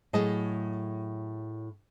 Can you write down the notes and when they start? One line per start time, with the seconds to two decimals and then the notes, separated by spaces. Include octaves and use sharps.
0.13 A2 F#3 G#4 D#5 A5